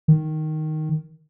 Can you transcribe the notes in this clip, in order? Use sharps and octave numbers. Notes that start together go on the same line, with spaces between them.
D#3